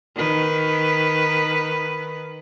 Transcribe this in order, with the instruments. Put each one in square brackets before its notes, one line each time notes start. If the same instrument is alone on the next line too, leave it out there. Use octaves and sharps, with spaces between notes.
[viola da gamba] D#3 B4